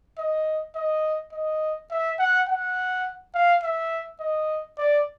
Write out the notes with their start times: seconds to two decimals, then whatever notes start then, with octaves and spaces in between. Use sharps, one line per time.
0.19 D#5
0.76 D#5
1.33 D#5
1.91 E5
2.19 F#5
2.48 F#5
3.35 F5
3.63 E5
4.20 D#5
4.78 D5